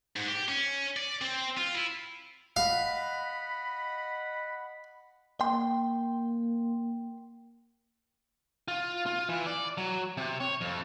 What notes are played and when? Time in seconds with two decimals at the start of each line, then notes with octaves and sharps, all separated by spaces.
0.16 G#2
0.29 G4
0.49 C#4
0.97 D5
1.21 C4
1.57 F4
1.75 E4
2.56 D#5 F5 F#5 B5
5.41 A#3 G5 C6
8.68 F4
9.06 F4
9.29 E3
9.47 D5
9.78 F#3
10.17 C3
10.40 C#5
10.61 F2